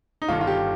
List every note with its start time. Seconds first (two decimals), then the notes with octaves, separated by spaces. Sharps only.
0.22 D#4
0.28 G1 G2 D#3 F4
0.41 F4
0.47 G4